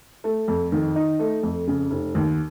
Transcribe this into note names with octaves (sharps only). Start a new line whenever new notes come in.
A3
F2
D#3
D#4
A3
F2
C#3
F1
D#2